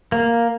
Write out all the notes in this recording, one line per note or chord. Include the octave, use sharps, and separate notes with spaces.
A#3